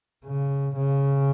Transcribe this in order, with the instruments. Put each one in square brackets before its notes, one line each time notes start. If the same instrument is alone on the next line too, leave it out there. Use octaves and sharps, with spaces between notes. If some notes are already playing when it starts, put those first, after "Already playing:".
[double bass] C#3
C#3